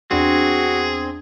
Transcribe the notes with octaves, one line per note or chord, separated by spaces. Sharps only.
E2 C4 D4 F#4 G#4 G#6